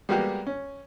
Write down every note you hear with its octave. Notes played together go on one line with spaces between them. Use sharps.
G3 G#3 A#3 B3 F#4 G4
C#4